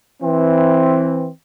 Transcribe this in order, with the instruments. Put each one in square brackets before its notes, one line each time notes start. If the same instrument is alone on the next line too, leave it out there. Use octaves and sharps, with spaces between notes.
[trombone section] E3 C4